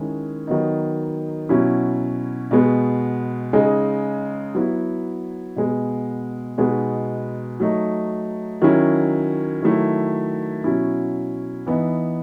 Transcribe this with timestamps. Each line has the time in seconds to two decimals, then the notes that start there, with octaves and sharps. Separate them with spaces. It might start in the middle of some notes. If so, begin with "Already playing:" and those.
Already playing: D#3 G#3 C#4 E4
0.47 D#3 F#3 B3 D#4
1.49 B2 F#3 C#4 E4
2.51 B2 G#3 B3
3.53 C#3 G#3 D#4
4.55 F#3 B3 E4
5.56 B2 G#3 B3
6.58 B2 G#3 B3 D#4
7.60 F#3 A3 D#4
8.61 D#3 F#3 C#4 E4
9.62 D#3 F#3 A3 E4
10.64 B2 F#3 C#4 E4
11.66 E3 B3 D#4